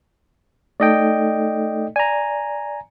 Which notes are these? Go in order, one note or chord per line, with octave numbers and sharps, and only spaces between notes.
A3 D#4 A4 D5 D#5 G5
D5 G#5 A#5